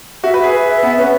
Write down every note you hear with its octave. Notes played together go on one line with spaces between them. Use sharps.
F#4 E5
B4 E5
G#4
B4
E5
B3 F#5
C#4 B4